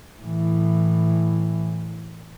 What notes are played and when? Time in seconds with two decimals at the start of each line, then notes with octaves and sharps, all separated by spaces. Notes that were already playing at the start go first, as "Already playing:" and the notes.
0.21 A2 E3